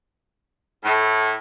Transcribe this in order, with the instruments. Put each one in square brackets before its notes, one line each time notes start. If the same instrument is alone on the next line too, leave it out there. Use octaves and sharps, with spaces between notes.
[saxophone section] A2